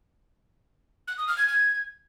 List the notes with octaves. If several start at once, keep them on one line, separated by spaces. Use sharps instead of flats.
F#6
D#6
F6
G#6
G#6